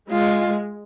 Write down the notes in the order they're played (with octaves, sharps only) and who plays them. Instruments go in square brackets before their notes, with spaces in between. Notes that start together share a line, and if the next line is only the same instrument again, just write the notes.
[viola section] G#3 [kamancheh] F4